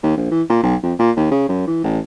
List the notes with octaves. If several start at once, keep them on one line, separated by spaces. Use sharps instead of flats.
D#2
A#1
E3
A#2
B1
F2
A#2
D#2
C#3
F#2
E3
A1